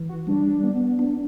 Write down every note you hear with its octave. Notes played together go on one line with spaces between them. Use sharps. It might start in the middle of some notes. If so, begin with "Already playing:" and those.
Already playing: E3
F#4
G3 D4
B3
D4